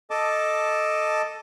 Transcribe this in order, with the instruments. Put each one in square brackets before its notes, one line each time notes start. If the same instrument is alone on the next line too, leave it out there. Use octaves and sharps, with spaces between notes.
[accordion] A4 D#5 A5 D6